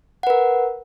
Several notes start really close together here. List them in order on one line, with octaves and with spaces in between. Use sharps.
F#5 B4 A#4